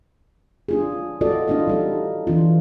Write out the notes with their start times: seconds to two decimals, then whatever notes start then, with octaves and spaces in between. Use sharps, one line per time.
0.68 D4 F4 G#4
1.21 F4 F#4 A4 D5 D#5
1.48 D4 E4 F4 D#5 F5
1.68 G3 D#4 A4
2.27 E3 D4 F4